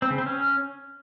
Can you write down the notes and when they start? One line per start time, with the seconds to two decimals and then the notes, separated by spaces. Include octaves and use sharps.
0.02 C4
0.10 C#3
0.18 C4
0.26 C#4